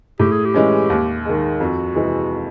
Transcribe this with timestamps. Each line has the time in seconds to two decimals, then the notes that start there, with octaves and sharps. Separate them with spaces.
0.20 A2 G4
0.31 G#4
0.45 G4
0.54 E3 G#3 C#4
0.90 D#2
1.25 D#3 G#3
1.60 F2 F#4
1.95 C3 E3 G#3